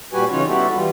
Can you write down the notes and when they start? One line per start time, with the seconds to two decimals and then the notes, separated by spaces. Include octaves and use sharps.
0.13 A#2 G3 F#4 G4 B4 G#5
0.31 C#3 E3 C#4 D#4 F4 C#5
0.48 G3 B3 E4 F#4 G4 A4
0.75 E3 G3 F4